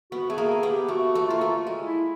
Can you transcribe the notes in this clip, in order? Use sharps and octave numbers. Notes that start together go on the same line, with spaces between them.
B3 F#4
A3 G#4
A#3
G#4
B3
G4
A3 F#4
A3
A#3 F4
A3 F#4
F4
G#3
E4